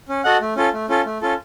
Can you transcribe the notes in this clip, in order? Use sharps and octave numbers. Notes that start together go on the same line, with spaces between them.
C#4
F#4 A4 D#5 F#5
A3
C#4 F4 A4
A3
C#4 F4 A4
A3
C#4 F4 A4